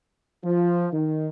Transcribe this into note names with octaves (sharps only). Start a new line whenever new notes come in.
F3
D#3